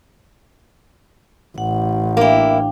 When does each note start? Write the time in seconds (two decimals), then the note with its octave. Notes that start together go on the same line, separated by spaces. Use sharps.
1.58 A1 F#5
2.17 A#3 D4 E4 F5 G5